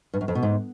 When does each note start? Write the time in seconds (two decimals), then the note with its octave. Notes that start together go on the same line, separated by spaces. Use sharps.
0.14 G2
0.21 F#2
0.28 F2
0.35 B2
0.43 G#2